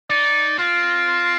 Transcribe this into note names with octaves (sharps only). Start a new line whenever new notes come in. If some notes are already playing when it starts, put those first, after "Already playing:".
D#4 D5
C4 F4